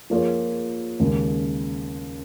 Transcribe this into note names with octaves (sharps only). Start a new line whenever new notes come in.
F3 A#3 F4 G#4 C#5
D#2 C#3 G#3